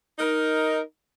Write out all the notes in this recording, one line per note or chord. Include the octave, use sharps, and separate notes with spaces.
D#4 A#4